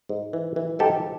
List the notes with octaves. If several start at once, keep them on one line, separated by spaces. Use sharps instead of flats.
G#2
E3
E3
G#2 G4 A4